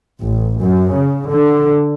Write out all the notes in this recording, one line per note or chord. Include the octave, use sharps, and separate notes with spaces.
A1
F#2
C#3
D3